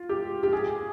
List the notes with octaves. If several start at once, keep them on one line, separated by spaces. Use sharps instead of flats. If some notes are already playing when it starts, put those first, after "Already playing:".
Already playing: F4
G4
G4
G#4